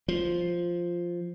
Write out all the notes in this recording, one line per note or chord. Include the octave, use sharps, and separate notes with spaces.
F3